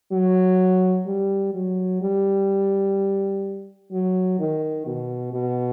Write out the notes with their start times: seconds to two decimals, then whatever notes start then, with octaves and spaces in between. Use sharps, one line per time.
0.12 F#3
1.07 G3
1.54 F#3
2.02 G3
3.92 F#3
4.40 D#3
4.86 B2
5.34 B2